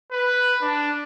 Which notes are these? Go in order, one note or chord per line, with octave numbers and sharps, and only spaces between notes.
B4
D4